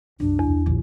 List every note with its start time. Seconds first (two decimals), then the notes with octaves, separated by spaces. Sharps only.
0.20 C2 F#2 D4
0.39 E2
0.66 A#1 D#2